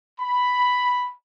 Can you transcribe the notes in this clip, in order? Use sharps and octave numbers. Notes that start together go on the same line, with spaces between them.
B5